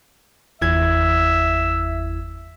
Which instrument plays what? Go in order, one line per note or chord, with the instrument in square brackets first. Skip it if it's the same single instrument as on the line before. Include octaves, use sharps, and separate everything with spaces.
[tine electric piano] G1 E4 G#6 [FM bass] E2 [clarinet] E5